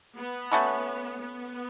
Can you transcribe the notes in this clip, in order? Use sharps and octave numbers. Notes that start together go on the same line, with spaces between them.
B3
A3 C#4 F#4 B4
B3